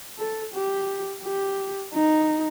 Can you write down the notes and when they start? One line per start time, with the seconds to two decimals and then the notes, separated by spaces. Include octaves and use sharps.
0.18 A4
0.53 G4
1.24 G4
1.93 D#4